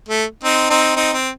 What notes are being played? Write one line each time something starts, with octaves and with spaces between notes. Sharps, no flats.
A3
C4 D#4
C4 D#4
C4 D#4
C4